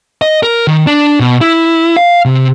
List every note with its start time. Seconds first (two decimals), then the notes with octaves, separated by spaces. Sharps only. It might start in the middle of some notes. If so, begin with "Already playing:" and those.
0.22 D#5
0.43 A#4
0.67 D#3
0.87 D4
1.20 B2
1.41 E4
1.97 F5
2.25 C3